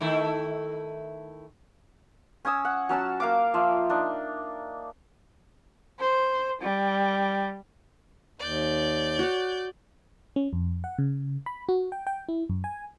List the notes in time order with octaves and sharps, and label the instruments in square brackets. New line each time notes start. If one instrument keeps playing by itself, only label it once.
[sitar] D#3 A3 E4
[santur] C#4 G#5 D#6 E6
F#5
F#3 C#4 A5 E6
A#3 F5 D6
F3 E5
D4 D#4
[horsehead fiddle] C5
G3
[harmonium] D#2 [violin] D5 G6
[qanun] F#4 C#5
[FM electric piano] C#4
F2
F#5
C#3
B5
F#4
G5
G5
E4
F#2
G#5